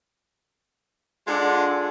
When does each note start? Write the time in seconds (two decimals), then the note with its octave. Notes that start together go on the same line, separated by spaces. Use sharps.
1.27 G#3 D4 F4 A4 F#5